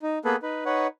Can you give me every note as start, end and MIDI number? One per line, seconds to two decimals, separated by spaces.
0.03 0.19 63
0.25 0.36 58
0.25 0.36 59
0.25 0.36 68
0.25 0.36 69
0.25 0.36 71
0.42 0.66 63
0.42 0.66 71
0.66 0.87 63
0.66 0.87 71
0.66 0.87 73
0.66 0.87 78